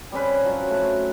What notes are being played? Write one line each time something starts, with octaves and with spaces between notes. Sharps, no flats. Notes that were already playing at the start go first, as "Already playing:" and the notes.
G3 C4 C#4 B4
F3 F#3
A3 F#4